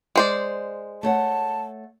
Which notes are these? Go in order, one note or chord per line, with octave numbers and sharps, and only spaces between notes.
G#3 C5 D5
A3 C#5 F#5 A5